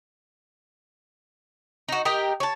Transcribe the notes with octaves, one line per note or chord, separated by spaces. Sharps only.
D#4 F#4
G4 A#4 D#5 G5
C#5 A5